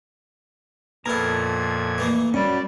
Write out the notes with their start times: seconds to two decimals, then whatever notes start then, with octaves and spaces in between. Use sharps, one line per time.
1.06 F2 A#2 B3 E4 A4 A#4 A#5 G#6
1.98 E3 A3 A#3
2.34 F#2 G3 C#4 F#4 D5